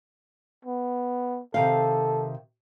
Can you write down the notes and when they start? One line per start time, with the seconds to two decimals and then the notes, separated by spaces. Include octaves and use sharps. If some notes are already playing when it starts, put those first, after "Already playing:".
0.65 B3
1.54 C3 D#3 A4 F5